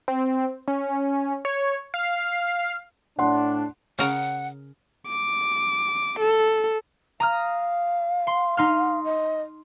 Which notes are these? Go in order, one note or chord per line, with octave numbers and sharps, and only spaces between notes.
C4
C#4
C#5
F5
A2 D4 F#5 C6
C#3 A#4 F#5 A#5
D6
A4
F5 A#5 D#6 F6
C6
D#4 C6 F6
D#5